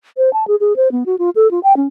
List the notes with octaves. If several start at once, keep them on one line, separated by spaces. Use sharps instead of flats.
C5
A5
G#4
G#4
C5
B3
F#4
F4
A4
F4
G5
C#4